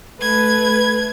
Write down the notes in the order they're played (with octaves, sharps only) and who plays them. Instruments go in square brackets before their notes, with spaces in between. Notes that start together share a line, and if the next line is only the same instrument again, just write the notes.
[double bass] A3 [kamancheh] B4 [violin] G#6